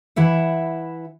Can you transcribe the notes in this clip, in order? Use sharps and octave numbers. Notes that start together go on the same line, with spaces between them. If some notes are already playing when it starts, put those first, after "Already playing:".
E3 E4 E5 F#5